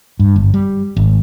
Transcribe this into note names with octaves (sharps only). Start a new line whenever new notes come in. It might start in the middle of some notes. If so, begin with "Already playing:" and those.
G2
G1
G3
G#1